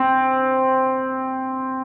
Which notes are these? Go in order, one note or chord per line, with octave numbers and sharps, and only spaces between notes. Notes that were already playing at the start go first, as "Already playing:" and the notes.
Already playing: C4